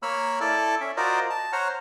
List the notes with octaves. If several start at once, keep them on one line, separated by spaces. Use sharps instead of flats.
A#3 C#5 B5 E6 F6
E4 A4 D5 A5
C#4 E5
F4 F#4 A#4 C5 D5 D#5
A5
C5 C#5 F#5 A#5 F6